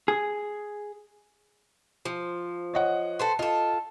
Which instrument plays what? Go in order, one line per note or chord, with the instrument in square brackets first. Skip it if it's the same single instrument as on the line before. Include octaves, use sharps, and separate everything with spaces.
[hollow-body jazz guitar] G#4
[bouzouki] F3
[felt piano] C#5 D#5 F#5
[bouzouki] A4 B4 C5
[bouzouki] F4 A4 [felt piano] D#5